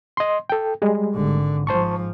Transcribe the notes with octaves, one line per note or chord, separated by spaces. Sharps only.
D#5 C6
A4 G5
G3 G#3
G#1 D3
G#2 F3 C5 A5 C#6